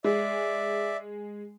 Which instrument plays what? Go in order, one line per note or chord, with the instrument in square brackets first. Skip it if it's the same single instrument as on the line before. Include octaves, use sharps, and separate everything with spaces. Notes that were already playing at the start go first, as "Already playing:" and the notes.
[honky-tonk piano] G#3 [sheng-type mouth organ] D5 E5